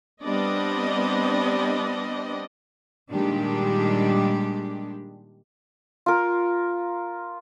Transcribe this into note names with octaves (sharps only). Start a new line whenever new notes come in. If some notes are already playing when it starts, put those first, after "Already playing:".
G3 B3 C4 D4 D5 D#5
A#2 D#3 G3 G#3 D4 G4
F4 A#4